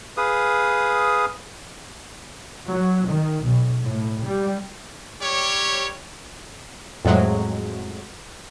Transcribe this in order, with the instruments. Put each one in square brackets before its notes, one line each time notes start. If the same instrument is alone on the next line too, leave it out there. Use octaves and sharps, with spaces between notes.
[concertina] G#4 B4 F5 D#6
[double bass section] F#3
D#3
B1
A2
G3
[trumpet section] G3 G4 C#5
[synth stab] F2 A2 F#3 G#3